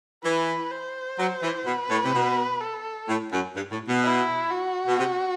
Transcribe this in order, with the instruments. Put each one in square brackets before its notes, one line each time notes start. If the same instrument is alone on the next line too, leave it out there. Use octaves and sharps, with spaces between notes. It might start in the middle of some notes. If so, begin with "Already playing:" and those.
[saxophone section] E3 [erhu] B4
[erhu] C5
[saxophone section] F#3
E3
[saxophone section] B2 [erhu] B4
[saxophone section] A2
C3
B2
[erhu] A4
[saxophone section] A2
F#2
G2
A2
B2
[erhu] E4
F#4
[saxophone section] B2
C3